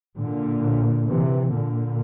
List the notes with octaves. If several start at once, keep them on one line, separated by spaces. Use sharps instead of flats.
A#2 D3
C3 E3
A#2 D3